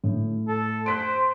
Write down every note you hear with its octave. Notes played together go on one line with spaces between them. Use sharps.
A2
A4
C5 F#6 B6 D7